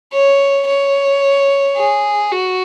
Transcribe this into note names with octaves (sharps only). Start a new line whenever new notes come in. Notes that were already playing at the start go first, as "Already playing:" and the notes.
C#5
C#5
G#4
F#4